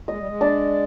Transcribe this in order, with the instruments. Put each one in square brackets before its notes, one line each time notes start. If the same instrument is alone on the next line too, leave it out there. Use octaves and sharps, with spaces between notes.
[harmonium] G#3 [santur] D#5
[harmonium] G3
G#3
[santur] D4